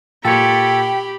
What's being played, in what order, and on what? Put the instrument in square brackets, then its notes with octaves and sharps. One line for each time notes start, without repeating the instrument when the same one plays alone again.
[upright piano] A#2 [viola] G4 B5 [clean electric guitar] A4 C#5 [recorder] G5